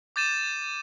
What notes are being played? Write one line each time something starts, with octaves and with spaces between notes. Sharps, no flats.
D6 G6 A6 D#7 E7